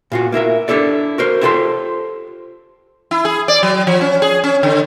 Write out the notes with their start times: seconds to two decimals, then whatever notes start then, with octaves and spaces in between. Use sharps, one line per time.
0.12 A#2 F4 F#4
0.32 A#3 E4 A#4 E5
0.68 D4 E4 G4 A4 D5
1.18 F#4 A#4 C5
1.41 E4 F4 G4 A4 C5 C6
3.11 E4
3.25 G#4
3.48 D5
3.63 F#3
3.87 F3
4.01 C#4
4.22 G#4
4.44 C#4
4.63 D3